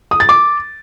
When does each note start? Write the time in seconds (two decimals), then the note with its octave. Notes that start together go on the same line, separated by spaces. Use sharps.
0.11 D#6
0.20 A6
0.29 D6